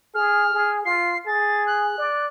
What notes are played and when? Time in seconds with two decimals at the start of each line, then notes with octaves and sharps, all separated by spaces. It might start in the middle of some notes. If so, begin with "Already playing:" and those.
0.14 G#4 F6
0.54 G#4
0.85 F4 C7
1.27 G#4 A6
1.67 F#6
1.98 D5